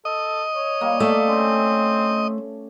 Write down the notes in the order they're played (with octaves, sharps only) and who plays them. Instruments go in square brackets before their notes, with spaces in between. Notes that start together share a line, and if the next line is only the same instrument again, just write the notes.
[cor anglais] A4 [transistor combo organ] D#5
[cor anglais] C#5
[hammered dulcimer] G3 A#3
[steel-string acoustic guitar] A3 [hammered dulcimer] D5 F5 A5
[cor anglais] C4 [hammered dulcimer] C#4